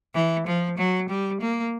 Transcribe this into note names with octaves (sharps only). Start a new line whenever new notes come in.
E3
F3
F#3
G3
A#3